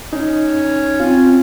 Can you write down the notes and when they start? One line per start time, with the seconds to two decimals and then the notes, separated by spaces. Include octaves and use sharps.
0.13 C#4 D#4
1.00 C4 F4